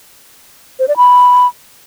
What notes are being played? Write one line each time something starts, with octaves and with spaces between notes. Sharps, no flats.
C5
D5
B5